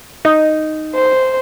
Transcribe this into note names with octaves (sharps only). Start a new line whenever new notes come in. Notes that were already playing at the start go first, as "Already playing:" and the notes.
D#4
C5